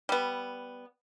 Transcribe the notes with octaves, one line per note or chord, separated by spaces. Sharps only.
G3 B3